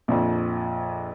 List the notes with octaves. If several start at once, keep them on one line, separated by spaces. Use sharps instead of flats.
A#1 F2